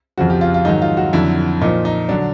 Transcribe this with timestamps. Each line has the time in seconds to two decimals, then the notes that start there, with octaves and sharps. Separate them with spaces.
0.18 F2 C#3 F3 F#4
0.30 G4
0.41 F4
0.54 F4
0.65 G#2 D#3 F#3 D#4
0.82 F4
0.97 F#4
1.13 F2 D3 F#3 E4
1.61 A#2 F3 D#4
1.85 D#4
2.09 D3 F#3 D4